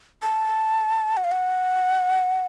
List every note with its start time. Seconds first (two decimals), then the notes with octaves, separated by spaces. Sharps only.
0.22 A5
1.17 F#5
1.24 F5
1.32 F#5